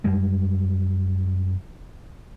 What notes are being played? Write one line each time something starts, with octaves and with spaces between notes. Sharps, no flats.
F#2 G3 G#3